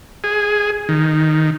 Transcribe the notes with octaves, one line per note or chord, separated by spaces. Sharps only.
G#4
D#3